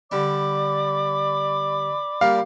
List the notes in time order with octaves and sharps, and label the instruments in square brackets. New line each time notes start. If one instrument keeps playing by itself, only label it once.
[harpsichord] D3 G3 D4 [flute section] D5 B5 D6
[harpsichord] G3 A#3 F4 [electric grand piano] F5